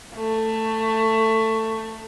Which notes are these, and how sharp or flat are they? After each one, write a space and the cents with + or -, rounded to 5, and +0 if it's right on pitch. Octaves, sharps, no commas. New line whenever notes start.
A3 +15